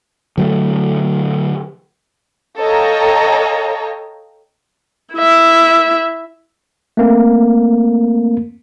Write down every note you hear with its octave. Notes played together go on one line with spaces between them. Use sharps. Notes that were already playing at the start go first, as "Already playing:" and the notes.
D3 F#3 G#3 A3
A4 C#5 D#5 F5 G5 A#5
E4 E5
A3 A#3 C4